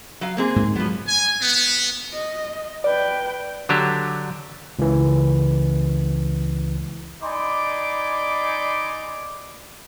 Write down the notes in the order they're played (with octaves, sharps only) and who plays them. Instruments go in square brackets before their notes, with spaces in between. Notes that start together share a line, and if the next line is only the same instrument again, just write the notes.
[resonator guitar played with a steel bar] F#3 F5
A#3 C4 G#4
[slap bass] G#2
[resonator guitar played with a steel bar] F3 B3 [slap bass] F#3
[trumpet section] G#5
B3
[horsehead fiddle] D#5
[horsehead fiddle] B4 G5 [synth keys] D5
[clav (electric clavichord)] D3 F#3 D4 G4
[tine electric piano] C#2 E3
[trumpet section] D#4 D5 G#5 B5 C6 D6